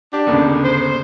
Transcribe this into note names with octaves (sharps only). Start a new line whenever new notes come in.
D4 G4
G1 D#2 C#3
C5